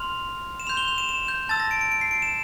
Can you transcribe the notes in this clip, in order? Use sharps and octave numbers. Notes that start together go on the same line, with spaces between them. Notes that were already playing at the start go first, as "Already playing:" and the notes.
Already playing: C6 F6 F7
E7
C6 G6 F7
G7
F7
E7
E7
G6
A5 E6 G6 A6
A#6
D7
D7
D7
C7
D7
E7